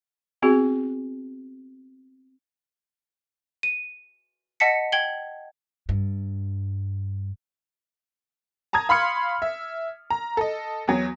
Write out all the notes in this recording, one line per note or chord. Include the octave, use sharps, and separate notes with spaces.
B3 C4 F#4 G#4
D#7
D#5 F#5 A5 B6 C#7
G5 G#6 F#7 G7
G2
A5 A#5 D#6 G#6
F5 B5 C6 F6 C#7
E5
A#5
A4 D#5
E2 F#3